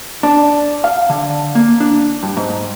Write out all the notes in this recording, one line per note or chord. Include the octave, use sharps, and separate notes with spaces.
D4
F5
D3
A#3
D4
G2
G#2